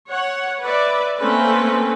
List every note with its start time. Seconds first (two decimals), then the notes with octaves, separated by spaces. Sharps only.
0.10 C#5 F#5
0.62 B4 D5 E5
1.19 A3 A#3 C4 C#4 B4